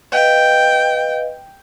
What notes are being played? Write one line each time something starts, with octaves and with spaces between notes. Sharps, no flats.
B4 D#5 F5 G5